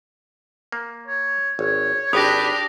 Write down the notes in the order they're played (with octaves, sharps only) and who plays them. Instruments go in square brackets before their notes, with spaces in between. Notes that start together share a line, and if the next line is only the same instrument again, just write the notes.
[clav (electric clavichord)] A#3
[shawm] C#5
[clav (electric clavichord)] G#1 [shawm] C#5
[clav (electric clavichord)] G#1 [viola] D4 G4 [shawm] B4 [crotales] D#6 A#6